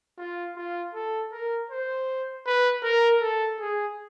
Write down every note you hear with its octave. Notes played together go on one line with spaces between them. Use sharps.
F4
F4
A4
A#4
C5
B4
A#4
A4
G#4